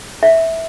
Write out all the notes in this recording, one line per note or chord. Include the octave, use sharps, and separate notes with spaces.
E5